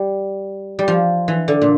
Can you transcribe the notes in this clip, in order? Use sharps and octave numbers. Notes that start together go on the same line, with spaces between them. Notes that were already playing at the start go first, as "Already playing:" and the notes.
Already playing: G3
G3
F3
E3
D3
A#2